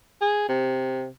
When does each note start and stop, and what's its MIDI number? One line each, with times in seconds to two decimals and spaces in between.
0.21 0.47 68
0.49 1.08 48